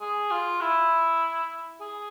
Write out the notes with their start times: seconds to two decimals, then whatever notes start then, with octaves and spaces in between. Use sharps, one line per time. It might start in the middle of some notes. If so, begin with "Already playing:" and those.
0.01 G#4
0.31 F4
0.61 E4
1.81 G#4